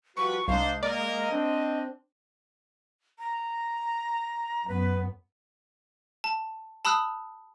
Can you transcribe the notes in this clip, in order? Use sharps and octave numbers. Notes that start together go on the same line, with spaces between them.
F3 G3 F#4 B4 C#6
C2 G#3 D4 D#4 C5 F5
A#3 A#4 D5 D#5
C4 D4
A#5
F#2 B3 B4
A5
A5 B5 D#6 E6 F#6